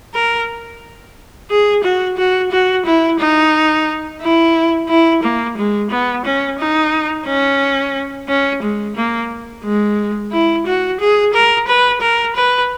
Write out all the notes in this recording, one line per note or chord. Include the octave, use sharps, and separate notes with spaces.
A#4
G#4
F#4
F#4
F#4
E4
D#4
E4
E4
A#3
G#3
B3
C#4
D#4
C#4
C#4
G#3
A#3
G#3
E4
F#4
G#4
A#4
B4
A#4
B4